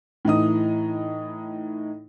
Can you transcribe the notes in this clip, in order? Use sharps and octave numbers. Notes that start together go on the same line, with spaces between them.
A2 E3 D#4 D#6